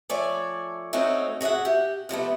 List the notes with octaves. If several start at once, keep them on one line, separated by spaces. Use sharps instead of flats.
F3 A3 C#5 D5 G#5
A3 C4 C#4 D#4 F#4
F#4 G#4 D#5 E5 F#5
G4
F2 C3 A3 B3